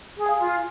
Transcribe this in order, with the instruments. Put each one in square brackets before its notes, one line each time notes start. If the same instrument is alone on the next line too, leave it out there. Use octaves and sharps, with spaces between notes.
[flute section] G#4
[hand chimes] F5 G#5
[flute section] F4